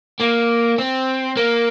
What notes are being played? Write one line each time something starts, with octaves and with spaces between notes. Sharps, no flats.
A#3
C4
A#3